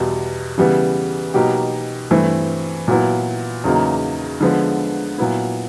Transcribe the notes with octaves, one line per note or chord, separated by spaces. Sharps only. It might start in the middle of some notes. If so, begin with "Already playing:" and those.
Already playing: E2 B2 G3
C#3 E3 G3 B3
B2 F#3 A#3 D#4 G4
G2 E3 A3 C4
A#2 F#3 B3 E4
E2 C#3 F#3 A#3 D#4
D3 F3 G#3 B3
A#2 F#3 B3 E4